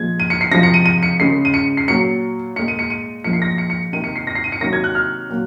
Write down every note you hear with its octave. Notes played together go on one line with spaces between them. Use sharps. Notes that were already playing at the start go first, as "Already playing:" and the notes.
Already playing: A#2 F3 G#3 G#6
D#7
C#7
C7
C3 F3 G#3 A#6
C#7
D#7
D#7
C#7
C#3 G#3 C7
D#7
C#7
C7
A#2 F#3 A#3 C#7
A#2 G#3 C#7
D#7
C#7
D#7
A#2 F3 G#3 C#7
C7
A#6
C#7
C#7
C3 D#3 A#3 D#7
C#7
C7
A#6
C7
D#7
C#7
C3 D#3 F#3 A#3 A#6
G#6
F#6
F6
A#2 F#3 A#3